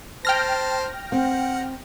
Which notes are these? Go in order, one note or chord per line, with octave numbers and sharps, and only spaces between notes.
C5 G5 A5 F6 A#6
C4 F#5